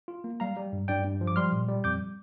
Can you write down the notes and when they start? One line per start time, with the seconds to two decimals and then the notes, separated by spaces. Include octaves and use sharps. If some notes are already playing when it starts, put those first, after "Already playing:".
0.08 F4
0.24 A#3
0.40 G3 F5 A#5
0.56 G3
0.73 G2
0.88 G2 D5 G5
1.04 G2
1.21 F3
1.27 D6
1.36 G3 C6 F6
1.52 A#2
1.68 G3
1.84 F2 D6 G6